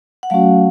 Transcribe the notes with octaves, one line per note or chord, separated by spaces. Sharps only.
F#5
F#3 A3 C#4 F#4 F5